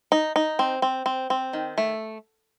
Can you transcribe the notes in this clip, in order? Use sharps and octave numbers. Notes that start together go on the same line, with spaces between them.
D#4
D#4
C4
C4
C4
C4
D#3
A3